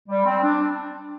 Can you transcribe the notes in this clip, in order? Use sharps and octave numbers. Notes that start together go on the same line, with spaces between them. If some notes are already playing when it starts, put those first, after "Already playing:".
G3
C4
D4